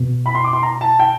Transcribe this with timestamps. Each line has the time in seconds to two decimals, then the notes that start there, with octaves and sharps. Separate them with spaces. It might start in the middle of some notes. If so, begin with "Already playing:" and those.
Already playing: B2
0.26 B5
0.35 C6
0.44 D6
0.53 C6
0.63 A#5
0.81 A5
1.00 G5